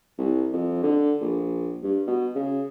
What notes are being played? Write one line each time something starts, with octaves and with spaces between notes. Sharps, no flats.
C2
F2
D3
A#1
G2
B2
C#3